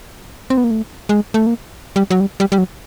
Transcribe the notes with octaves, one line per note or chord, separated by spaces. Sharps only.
C4
B3
A#3
A3
G#3
A3
A#3
G3
F#3
G3
G3
G3
F#3